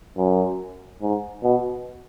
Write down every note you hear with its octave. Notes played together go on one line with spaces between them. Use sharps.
F#2
G#2
B2